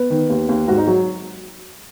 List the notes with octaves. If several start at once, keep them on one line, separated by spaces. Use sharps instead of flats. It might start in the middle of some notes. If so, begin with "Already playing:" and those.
Already playing: B3 B4
D#3
D#2
D#2
G#2 F#4
D#4
F#3 F#4